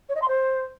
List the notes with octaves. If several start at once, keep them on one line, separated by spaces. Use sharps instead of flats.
C#5
D#5
C6
C5